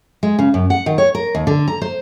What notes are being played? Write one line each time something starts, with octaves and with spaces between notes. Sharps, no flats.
G#3
C#3
F#2
F#5
D#3
C#5
A#4
D#2
D3
A#5
C5